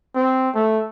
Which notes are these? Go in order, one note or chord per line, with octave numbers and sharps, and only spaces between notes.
C4
A3